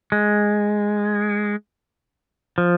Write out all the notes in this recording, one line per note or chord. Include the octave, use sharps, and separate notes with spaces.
G#3
F3